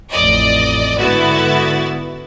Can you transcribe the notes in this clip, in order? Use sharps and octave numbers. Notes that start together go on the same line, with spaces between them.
A1 F2 D5 D#5
G#2 D3 B3 E4 F#4 A6